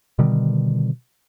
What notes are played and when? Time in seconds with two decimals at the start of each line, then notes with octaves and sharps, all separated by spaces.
0.19 B2 D3 D#3 G3